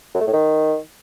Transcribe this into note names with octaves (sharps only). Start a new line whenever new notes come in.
F#2
A3
A2
D#3